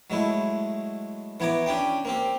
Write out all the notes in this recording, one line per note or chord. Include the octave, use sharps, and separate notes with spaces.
F#3 G#3 A3 E4
E3 B3 C#5 A#5 D6
C#4 D4 G4 G5
A#3 C4 G4